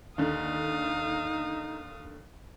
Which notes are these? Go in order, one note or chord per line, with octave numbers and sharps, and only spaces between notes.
D#2 D3 D#4 F5 D#6